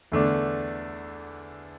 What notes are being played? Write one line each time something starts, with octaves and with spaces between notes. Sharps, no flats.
E2 D3 A3 D4